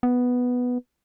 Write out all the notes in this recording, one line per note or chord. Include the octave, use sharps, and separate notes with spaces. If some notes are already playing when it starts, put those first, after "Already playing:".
B3